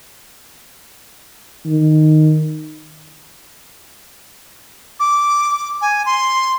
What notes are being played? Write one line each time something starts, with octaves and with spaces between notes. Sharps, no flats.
D#3
D6
G#5
C6